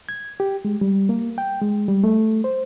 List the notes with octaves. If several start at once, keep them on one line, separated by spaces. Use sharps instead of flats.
G#6
G4
G#3
G3
A#3
G5
G#3
G3
A3
C5